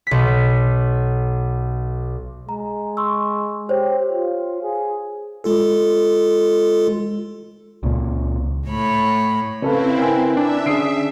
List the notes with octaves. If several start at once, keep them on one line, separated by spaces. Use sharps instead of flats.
B1 B6
G#3 A#5
C6 C#6 E6
G4 C5 C#5
F4
G#4
G#3 F4 A4
C#2 A#2
A2 C#5 B5
C#3 C4 C#4 E4 A4 B4 F5
A#4 B4 G5 G#5
D4 E5
D3 C#4 G#4 D#6 C7 D7